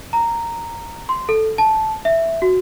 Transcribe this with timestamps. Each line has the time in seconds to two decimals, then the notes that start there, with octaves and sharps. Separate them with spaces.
0.13 A#5
1.09 C6
1.29 A4
1.58 A5
2.05 E5
2.42 F#4